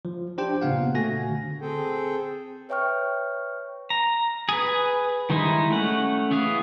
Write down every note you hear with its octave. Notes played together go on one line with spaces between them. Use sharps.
F3
D4 G4 C5 G5
A#2 C#3 B3 F5 F#5
A3 F#4 G#5 A#6
D3
C4 G#4 A4 G5
B4 C#5 E5 G5 C#6 F6
A#5
G#4 B4
D#3 G3 G#3 D#4 E4
A3 C#4 F#5
E3 B3 G#4 F5